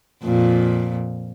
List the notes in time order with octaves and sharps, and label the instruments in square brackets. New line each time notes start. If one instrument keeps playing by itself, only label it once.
[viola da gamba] F2 A#2